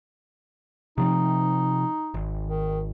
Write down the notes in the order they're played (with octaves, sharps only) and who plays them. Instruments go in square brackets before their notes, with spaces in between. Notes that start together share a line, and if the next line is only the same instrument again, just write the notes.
[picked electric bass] C3 F3 C4 [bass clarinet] D#4
[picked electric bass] G#1
[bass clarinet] D#3